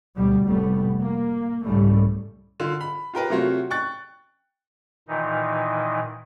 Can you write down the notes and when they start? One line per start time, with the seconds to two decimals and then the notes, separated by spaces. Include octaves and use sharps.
0.16 D2 B2 G3
0.48 F1 A2 G3 A3 B3
1.01 A#3
1.64 C2 G#2 C#3 G3 A3
2.60 D3 F4
2.81 B5
3.14 F4 G4 A#4 B4
3.30 C3 F#3 A3 F4 F#4
3.70 G5 C#6 F#6 A6
5.08 A#2 D#3 E3 D#4